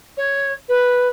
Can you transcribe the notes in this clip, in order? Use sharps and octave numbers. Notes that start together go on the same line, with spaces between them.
C#5
B4